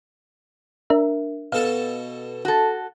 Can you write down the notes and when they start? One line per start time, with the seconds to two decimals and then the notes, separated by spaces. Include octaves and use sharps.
0.90 D4 A#4 E5
1.52 B2 A4 F5 A5
2.45 F#4 A4